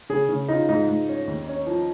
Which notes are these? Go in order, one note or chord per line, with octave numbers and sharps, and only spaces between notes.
C#3 G#4
C#3
D#4 F4
G#2 D#4
G#2
C#4
D#2
C#4
F3